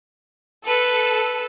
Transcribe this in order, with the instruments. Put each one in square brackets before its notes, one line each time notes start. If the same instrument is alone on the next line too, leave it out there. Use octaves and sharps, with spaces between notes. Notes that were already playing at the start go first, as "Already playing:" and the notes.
[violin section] A4 [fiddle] B4